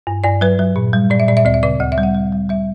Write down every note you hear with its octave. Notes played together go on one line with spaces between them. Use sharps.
G2
G2 D5
F#3 B4
F#3
A#2
G3
A#2 D5
E5
A#2 D5
E5
D2 D5
E5
C#3 D5
D2 F#5
E5
G3
F#5
G3
G3
G3 E5